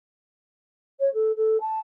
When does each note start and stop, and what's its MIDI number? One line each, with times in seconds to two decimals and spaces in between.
1.00 1.11 73
1.13 1.31 69
1.36 1.57 69
1.60 1.78 81